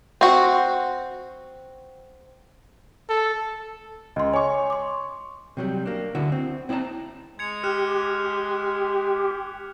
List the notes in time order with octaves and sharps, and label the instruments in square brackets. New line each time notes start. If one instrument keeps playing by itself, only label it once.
[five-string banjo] C4 F#4
[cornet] A4
[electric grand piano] C#2 [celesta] D#5 C6
[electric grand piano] C#5 C#6 [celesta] G#5 D6
[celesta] C6 D6
[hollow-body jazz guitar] C3 F#3 G3
A#3 D4
D2 D3 E4 F#4
C4
C4 E4 C#5 D5 A5 A#5
[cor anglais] G#3 [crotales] G#6 C#7 F7
[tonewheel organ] G4 [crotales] F6 F#6 E7